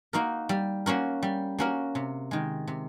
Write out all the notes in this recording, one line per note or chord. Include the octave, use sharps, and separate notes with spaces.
A#3 D#4 F#4 A#4
G3
A#3 C#4 F#4 A#4
G3
A#3 C#4 F#4 A#4
C3
D#3 G#3
C3